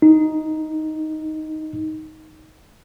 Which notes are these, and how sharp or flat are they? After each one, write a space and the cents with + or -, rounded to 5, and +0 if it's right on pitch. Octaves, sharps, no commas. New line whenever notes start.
D#4 +5